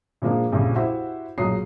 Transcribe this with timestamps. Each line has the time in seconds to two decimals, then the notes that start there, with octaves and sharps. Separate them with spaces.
0.22 A#2 F3 G#3 A#3 D4
0.52 A#1 F2 A#2 C#3 G3
0.76 E4 F#4 G4 C5 E5 F#5
1.38 B1 A#2 F#3 G#3 D#6 C7